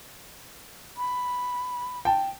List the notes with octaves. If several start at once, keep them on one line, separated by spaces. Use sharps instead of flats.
B5
G5 A5